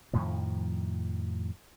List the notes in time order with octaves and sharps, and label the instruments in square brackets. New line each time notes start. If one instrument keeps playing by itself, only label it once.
[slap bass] F2 A2 D#3 F3